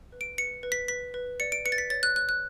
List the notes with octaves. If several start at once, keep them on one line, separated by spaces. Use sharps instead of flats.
B4
D7
B4 C#7
B4
B6
B4 B6
B4
D5 C#7
D7
B4 C#7
A6
B6
C#5 A6
F#6
C#5 F#6
F#6